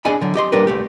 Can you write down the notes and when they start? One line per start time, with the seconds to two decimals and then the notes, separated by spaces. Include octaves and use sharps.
0.05 D4 G#4 D5 D#5 G#5 B5
0.21 D3 F#3
0.35 G4 D#5 C6
0.52 G3 A#3 D4 G4 A#4 B4
0.67 C2 A3 G4